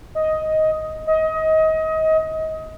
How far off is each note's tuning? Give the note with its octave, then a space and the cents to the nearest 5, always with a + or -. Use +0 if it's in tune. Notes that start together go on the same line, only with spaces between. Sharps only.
D#5 +10
D#5 +25